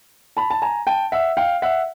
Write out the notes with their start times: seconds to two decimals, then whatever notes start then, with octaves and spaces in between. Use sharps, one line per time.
0.37 A5 B5
0.50 A5
0.62 G#5 A#5
0.87 G5 A5
1.12 E5 F#5
1.37 F5 G5
1.62 E5 F#5